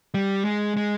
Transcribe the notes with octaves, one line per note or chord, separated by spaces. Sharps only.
G3
G#3
G#3